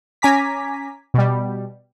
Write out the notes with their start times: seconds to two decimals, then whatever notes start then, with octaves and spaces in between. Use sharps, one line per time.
0.22 C#4 G#5 A#5 D6 B6
1.14 B2 G3